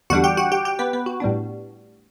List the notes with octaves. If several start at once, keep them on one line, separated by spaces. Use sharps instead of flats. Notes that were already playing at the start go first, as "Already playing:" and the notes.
E2 D3 G3 D4 F#4 F#5
G4 G5
F#4 F#5
G4 G5
G4 G5
B3 B4
B3 B4
F#4
A2 G3 B3 D4